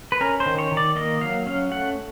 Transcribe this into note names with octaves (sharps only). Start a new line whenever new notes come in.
B4
C#4 A#4
C5
D#3
C#5
D#3
D5
A#3 D#5
F#3 F5
C#4 F5
A3 F#5